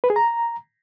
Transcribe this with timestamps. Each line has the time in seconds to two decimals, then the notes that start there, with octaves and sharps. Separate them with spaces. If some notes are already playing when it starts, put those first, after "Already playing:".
0.04 B4
0.10 G#4
0.16 A#5